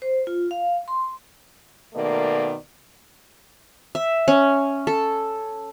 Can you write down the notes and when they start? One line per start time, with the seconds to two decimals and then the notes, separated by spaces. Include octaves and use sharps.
0.02 C5
0.27 F4
0.51 F5
0.88 C6
1.94 B2 D#3 A3 A#3 D5
3.95 E5
4.28 C#4
4.87 A4